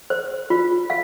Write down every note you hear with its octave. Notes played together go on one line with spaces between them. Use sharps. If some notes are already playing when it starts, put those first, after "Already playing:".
C5
F4
F5